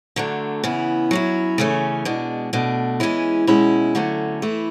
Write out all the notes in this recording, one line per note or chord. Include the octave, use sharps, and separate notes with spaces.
D3 F#3 A3 D4
C#3 E3 B3 E4
F#3 C#4 E4
C#3 E3 A3 C#4
B2 G#3 D4
B2 A3 D4
E3 G#3 C#4 E4
B2 G#3 C#4 E4
D3 F#3 A3 C#4
E3 A3 E4